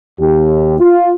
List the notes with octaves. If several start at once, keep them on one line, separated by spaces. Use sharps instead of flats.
D#2 G4
F4